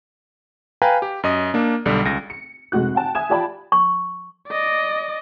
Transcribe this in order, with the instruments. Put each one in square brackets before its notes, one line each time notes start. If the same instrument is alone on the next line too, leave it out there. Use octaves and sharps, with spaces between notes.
[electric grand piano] B4 F5 G5 G#5 A#5
G4
F#2 D#5 D#6
A#3 D4
B1 D3 G3
C#2 A#6
[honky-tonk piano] C#7
F1 G#3 F#4 F#6
F#5 G5 A5
E5 G#5 D#6 G#6 E7
F4 G4 D5 G5 A5 B5
[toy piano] C#6
[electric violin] D5 D#5